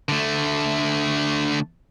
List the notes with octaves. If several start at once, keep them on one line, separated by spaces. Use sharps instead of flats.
D3 A3